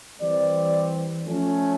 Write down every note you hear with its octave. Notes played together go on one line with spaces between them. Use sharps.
E3 G3 C4 D5
F3 A3 C#4